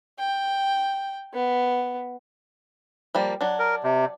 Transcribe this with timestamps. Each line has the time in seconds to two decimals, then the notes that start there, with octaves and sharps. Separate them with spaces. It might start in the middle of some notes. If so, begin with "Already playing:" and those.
0.19 G5
1.34 B3
3.15 F3 G3 A#3
3.41 F#3 D4
3.59 A#4
3.83 C3